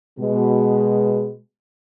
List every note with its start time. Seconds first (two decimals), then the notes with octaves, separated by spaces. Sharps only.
0.19 B2 G#3